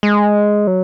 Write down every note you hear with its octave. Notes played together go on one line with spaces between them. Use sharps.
G#3
F#3